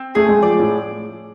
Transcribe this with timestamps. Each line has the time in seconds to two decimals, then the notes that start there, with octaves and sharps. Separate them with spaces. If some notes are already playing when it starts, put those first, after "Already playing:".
Already playing: C4
0.15 A3 G#4
0.29 G#3
0.42 F3 D5
0.59 A2